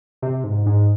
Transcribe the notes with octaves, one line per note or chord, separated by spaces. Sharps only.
C3
G#2
G#2